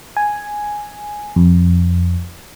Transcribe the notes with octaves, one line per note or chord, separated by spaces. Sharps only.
G#5
F2